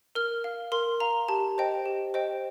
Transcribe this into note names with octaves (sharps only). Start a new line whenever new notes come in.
A#4 F6
F5
A#4 C6
F5 A#5
G4 A5
C5 D#5 G5
G4
C5 D#5 G5